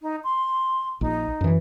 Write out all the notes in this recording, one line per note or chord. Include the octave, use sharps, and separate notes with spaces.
D#4
C6
A#1 D#4
F#2 E3